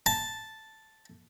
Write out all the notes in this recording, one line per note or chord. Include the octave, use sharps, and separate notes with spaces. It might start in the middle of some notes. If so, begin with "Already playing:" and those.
A5